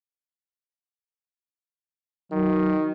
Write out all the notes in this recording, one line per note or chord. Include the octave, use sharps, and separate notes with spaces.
D#3 F#3